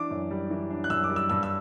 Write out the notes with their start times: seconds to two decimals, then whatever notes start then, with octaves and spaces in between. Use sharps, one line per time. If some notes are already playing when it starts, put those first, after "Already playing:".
Already playing: E3 D4 D6
0.11 F#2
0.31 G3
0.50 E3
0.70 D4
0.84 F#6
0.90 F#2 E6
1.04 D6
1.10 G3
1.16 E6
1.30 G2 E6
1.43 E6